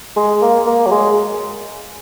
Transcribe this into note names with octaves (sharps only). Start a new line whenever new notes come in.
G#3
A#3
A#3
F#3
G#3